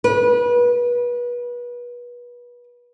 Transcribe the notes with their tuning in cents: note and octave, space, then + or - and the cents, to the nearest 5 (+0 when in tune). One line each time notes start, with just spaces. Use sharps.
B4 -30